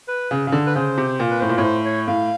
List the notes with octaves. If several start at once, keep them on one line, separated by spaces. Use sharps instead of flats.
B4
C#3
C#3
D3
B4
C#3 C5
C3
A#2
B4
A2 C5
A#2
A2 C#5
C5
C#5
A2 F5